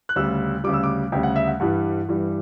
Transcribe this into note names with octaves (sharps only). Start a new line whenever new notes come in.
F#6
D2 C#3 G3 E6
D2 C#3 G3 D6
E6
D6
D2 C#3 G3 G5
F#5
E5
F#5
G2 E3 G3 F#5
G2 E3 G3